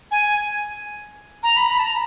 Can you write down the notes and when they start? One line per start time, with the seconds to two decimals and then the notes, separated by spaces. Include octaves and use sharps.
0.11 G#5
1.43 A#5
1.57 B5
1.70 B5
1.79 A5
1.83 A#5